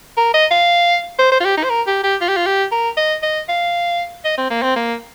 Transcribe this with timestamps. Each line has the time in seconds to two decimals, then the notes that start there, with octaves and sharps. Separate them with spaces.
0.17 A#4
0.34 D#5
0.51 F5
1.19 C5
1.32 C5
1.41 F4
1.45 G4
1.58 D#4
1.64 C5
1.70 A#4
1.87 G4
2.04 G4
2.21 F4
2.28 G4
2.37 F4
2.46 G4
2.72 A#4
2.97 D#5
3.23 D#5
3.49 F5
4.25 D#5
4.38 C4
4.51 A#3
4.62 C4
4.76 A#3